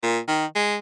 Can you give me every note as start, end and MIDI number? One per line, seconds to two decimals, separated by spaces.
0.03 0.19 46
0.28 0.45 51
0.55 0.76 56